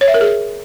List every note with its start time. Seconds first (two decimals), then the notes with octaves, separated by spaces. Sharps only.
0.01 C#5
0.08 E5
0.14 A#4
0.21 G#4